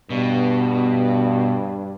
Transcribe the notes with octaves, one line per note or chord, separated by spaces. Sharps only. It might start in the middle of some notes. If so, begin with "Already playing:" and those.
G2 B2